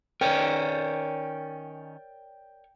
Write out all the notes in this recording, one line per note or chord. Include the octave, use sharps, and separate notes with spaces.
D#3 C#4 A#4 C#5 D5 G5